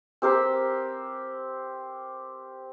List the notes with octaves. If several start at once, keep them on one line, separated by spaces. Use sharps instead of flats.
C4 G4 A#4 C5